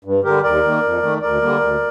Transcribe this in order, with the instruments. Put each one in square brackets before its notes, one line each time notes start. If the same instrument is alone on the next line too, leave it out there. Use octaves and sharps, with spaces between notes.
[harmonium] G2
D3 G3 G4 A#4
D#2 A#4 D5
D#3 A#3
F2
D#3 A3
D2 A#4 D5
D3 G3 A#3
D2